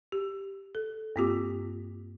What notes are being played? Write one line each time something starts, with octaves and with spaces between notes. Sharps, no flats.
G4
A4
G2 A#3 C4 F4 G4 D6